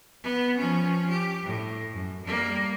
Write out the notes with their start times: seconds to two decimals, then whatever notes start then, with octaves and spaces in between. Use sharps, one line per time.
0.23 B3
0.58 F3 C#4
1.10 G4
1.44 A2
1.93 F#2
2.24 G3 A#3